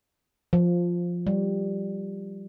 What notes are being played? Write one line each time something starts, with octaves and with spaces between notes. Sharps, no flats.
F3
G3